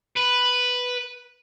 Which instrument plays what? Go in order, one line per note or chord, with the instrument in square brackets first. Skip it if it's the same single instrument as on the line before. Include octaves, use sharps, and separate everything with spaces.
[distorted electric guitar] B4